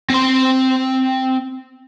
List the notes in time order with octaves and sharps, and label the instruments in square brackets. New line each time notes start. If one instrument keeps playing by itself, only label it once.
[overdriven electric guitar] C4 C6